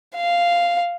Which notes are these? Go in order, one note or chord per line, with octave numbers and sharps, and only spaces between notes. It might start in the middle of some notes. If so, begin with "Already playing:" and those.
F5